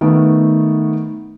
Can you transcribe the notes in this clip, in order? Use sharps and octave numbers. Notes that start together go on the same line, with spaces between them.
D#3 A3 B3